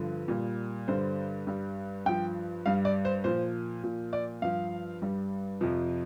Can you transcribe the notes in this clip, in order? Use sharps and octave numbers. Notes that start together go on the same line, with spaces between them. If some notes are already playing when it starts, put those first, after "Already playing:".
Already playing: G2 D3 F3
A#2 G3
G2 D3 G3 C5
G2 G3
G2 F3 G5
G2 G3 F5
D5
C5
A#2 F3 C5
A#2 F3
D5
G2 F3 F5
G2 G3
F2 C3 F3